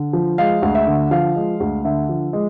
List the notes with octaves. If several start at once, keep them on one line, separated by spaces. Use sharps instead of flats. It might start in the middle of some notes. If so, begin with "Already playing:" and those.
Already playing: D3
F3
G#3 F5
D2
E5
D3
F3 F5
G#3
D2
D3 E5
F3
G#3